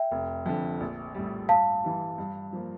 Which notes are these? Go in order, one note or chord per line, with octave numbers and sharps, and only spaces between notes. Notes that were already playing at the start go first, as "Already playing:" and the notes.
Already playing: E5 G5
F1
F2 D3
A#1
A2 G3
G2 F5 A5
E3 G3
G2
F3 A#3